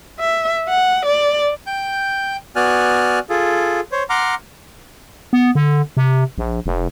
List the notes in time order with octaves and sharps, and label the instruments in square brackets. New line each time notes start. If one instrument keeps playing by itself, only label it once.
[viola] E5
F#5
D5
[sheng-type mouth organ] G5 G6
B3 F#4 D5 G#5 F6 F#6
F4 G#4 A4
C5 C#5
F#5 A#5 C6 D6 F6
[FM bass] B3
D3
C3
A#1
F1